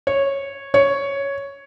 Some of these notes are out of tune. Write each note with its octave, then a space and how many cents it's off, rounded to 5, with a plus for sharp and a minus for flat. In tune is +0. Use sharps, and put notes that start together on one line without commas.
C#5 -10
C#5 +5